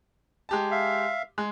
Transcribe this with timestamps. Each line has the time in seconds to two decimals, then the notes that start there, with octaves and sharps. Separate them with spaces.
0.49 G#3 G4 A5
0.71 E5 F5
1.38 G#3